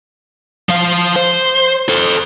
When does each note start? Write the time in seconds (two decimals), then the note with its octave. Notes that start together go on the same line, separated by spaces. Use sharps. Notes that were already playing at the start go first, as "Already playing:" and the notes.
0.69 F3 F5
1.16 C5
1.89 A4 C5